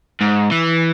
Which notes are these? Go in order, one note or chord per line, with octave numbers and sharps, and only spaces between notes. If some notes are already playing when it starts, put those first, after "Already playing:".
G#2
E3